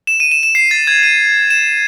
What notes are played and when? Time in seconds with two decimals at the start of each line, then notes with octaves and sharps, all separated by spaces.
0.07 E7
0.20 D#7
0.31 E7
0.43 E7
0.55 C7
0.71 A6
0.87 G#6
1.03 D#7
1.50 E7